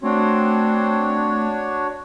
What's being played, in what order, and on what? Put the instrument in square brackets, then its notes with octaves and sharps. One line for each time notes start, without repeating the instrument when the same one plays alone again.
[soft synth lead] A3 [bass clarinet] C4 [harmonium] D4 F#4 C#5